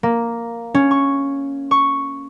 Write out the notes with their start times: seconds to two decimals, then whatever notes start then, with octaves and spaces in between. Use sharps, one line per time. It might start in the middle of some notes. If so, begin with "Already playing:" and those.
0.03 A#3
0.74 C#4
0.91 C#6
1.71 C#6